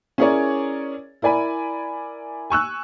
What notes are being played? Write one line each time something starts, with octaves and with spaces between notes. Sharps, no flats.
C#4 E4 G#4 A#4 C#5 D5
E4 A#4 D5 G#5 B5
G#5 C#6 E6 F#6